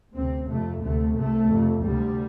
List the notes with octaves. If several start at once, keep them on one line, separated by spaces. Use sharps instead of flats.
D2 C3 C4
F2 C3 A3
D2 C3 A3
C2 C3 A3
F2 C3
D2 C3 G3